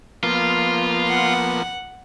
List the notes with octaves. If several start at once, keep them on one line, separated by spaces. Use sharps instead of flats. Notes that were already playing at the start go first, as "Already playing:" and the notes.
F3 A#3 B3 F4
F#5